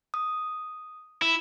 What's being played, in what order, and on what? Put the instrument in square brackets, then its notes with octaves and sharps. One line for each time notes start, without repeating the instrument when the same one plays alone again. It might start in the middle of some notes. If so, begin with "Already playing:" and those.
[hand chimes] D#6
[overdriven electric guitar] E4